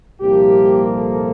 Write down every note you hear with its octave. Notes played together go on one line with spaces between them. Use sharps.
C2 A#2 F3 A#3 G4
A4